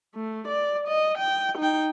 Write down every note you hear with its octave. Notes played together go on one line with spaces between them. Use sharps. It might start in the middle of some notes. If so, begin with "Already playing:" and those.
A3
D5
D#5
G5
D#4 G5